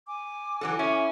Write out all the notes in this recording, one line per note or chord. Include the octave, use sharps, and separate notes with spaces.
G#5 D6
E3 F#3 A4
C#4 E4